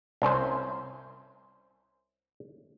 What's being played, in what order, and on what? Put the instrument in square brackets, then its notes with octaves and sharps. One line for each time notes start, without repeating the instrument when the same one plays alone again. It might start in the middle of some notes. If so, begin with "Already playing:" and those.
[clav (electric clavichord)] C2 C#4 C5